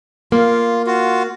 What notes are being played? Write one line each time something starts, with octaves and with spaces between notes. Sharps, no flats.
A#3 F4
F4 F#4